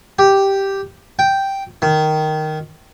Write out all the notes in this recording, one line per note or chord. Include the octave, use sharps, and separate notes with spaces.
G4
G5
D#3